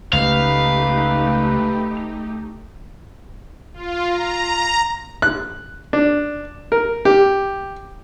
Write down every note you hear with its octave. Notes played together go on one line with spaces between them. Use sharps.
C#2 A3 D#4 G4 B4 F5
F4
A#5
F#6
D4
A#4
G4